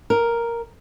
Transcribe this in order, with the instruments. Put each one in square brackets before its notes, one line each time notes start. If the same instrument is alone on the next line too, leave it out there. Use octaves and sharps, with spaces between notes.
[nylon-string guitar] A#4